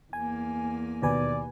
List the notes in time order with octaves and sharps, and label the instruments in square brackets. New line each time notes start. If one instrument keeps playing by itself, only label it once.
[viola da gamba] E2 A#3 [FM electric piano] G#5
[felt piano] D#2 [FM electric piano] B2 B4 G#5 [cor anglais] D5